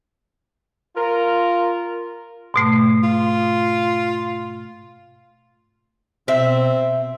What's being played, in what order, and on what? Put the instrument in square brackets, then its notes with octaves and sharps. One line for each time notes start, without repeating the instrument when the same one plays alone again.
[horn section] F4 A#4
[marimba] G#2 B2 A3
[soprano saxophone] F4
[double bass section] B2 [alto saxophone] C4 [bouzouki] E5